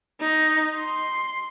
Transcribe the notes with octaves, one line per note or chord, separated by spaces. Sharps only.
D#4
C6